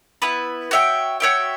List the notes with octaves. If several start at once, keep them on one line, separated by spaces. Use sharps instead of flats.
B3 E4 B4
F#4 C#5 E5 G5
F#4 C#5 E5 G5